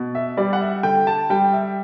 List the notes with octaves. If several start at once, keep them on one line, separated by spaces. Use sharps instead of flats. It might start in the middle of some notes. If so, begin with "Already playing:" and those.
Already playing: B2
E5
G3 D5
F#5
E5
D3 G5
A5
G3 G5
E5